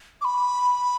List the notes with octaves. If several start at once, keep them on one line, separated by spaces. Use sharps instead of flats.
D6
B5